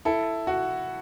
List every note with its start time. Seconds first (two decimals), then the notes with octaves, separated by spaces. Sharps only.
0.05 E4 A4
0.47 F#4